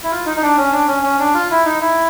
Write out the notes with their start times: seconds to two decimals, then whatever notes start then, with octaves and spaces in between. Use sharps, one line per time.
0.04 E4
0.11 F4
0.26 D#4
0.37 D#4
0.42 D4
0.57 C#4
0.72 D4
0.88 C#4
1.03 C#4
1.20 D4
1.34 F4
1.51 E4
1.65 D#4
1.81 E4